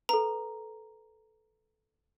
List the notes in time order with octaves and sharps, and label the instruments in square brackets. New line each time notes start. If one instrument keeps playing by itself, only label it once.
[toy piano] A4 B4 [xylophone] A#5